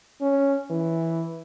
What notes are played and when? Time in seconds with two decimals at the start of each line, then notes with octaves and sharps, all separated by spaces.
0.21 C#4
0.70 E3